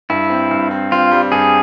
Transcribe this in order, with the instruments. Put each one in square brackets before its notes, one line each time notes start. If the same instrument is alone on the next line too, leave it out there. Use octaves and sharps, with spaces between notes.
[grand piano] G2 [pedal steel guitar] E4
[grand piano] C4
G2
C4
[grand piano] C4 [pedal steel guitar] F4
[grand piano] G3
[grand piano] G2 [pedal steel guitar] G#4